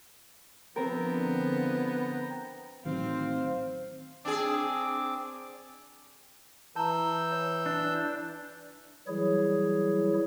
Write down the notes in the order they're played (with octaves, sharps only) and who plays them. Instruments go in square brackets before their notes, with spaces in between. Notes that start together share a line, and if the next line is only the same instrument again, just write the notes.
[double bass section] D3 F3 [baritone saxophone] B3 [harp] C4 A#4 [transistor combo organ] G5 A#5
[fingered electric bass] A1 D#3 F#3 [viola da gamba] C4 [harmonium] C5 F5
[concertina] C4 D6 [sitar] D4 G#4
[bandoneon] E3 E6 G6 [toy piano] A5 A#5
[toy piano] C#5
[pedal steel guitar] D4
[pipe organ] E3 F#3 G3 E4 G#4 C#5